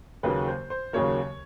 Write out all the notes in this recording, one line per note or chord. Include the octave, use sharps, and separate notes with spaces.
D#2 C#3 F#3 A#3 B4
C5
C5
D#2 C#3 F#3 A#3 C#5